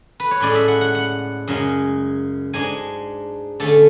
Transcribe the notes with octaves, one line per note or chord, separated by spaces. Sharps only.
B4
C#5
A2 G#3 C#4 D5
E5
F#5
F#5
F#5
F#2 C#3 G#3
G#2 G#3 D4 G#5
D3 A3 C#4 A5